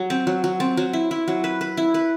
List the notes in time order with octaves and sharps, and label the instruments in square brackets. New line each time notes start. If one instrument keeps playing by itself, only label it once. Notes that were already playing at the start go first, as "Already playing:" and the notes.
Already playing: [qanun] F#3
C4
F#3
F#3
C4
F#3
E4
E4
F#3
B4
B4
E4
B4